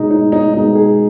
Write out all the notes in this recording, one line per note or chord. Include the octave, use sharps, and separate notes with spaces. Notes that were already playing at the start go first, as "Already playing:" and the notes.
Already playing: B2 G#3 D#4
D#4
D#4
B2 G#3 D#4
G#4